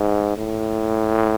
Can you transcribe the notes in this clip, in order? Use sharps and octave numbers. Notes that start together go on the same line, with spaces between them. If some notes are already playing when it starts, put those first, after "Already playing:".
Already playing: G#2
A2